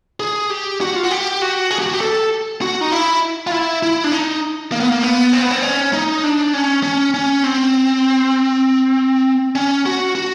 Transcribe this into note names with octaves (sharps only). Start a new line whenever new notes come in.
G#4
G4
F#4
F4
F#4
G4
F#4
G#4
G4
F#4
G4
A4
F#4
D#4
E4
F4
E4
E4
D4
D#4
A#3
B3
A#3
B3
C4
B3
C4
C#4
D#4
D4
C#4
C#4
C#4
C4
C#4
F#4
F#4